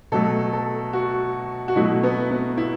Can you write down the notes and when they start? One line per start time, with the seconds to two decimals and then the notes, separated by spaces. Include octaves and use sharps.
0.12 B2 F#3 A3 A4
0.53 A4
0.93 F#4
1.68 F#4
1.76 B2 F#3 A3 E4
2.03 B3
2.31 B3
2.58 E4